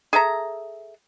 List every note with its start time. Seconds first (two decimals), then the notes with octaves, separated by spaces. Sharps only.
0.13 G#4 A4 E5 A#5